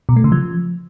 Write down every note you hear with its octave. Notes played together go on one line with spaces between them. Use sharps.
B2
A3
C#3
F3